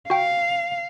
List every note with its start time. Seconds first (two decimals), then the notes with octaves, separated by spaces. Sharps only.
0.10 F#4 F5 G5